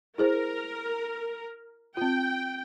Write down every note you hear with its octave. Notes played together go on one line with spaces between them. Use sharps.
E4 G#4 A#4 C5
C4 F4 G5